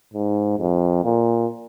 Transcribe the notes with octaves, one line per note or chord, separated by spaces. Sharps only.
G#2
F2
A#2